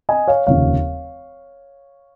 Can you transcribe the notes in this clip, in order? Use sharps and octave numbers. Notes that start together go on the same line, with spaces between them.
D#5 G#5
C#5 F5
F1 D#2 C#3 F3 C#5 F5